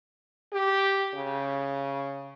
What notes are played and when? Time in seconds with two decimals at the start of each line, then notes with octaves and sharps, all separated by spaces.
0.53 G4
1.15 C#3